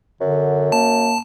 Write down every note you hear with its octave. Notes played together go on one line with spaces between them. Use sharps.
F#2 D3
A#3 A5